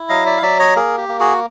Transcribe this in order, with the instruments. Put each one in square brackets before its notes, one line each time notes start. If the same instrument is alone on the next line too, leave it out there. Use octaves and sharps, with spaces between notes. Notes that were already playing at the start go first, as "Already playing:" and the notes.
Already playing: [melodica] E4
F#3 D#5 F5
D5 E5
F5
F#3 D5 E5
C#5 D#5
A#3 G#4 A#4
G4
A#3
F#4 G#4